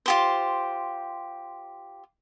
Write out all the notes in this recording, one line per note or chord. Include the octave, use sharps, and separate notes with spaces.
F4 G4 C5